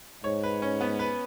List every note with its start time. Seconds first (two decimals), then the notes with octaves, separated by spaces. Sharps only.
0.24 G#2 C#5
0.44 B4
0.62 C#4
0.81 B3
0.99 B4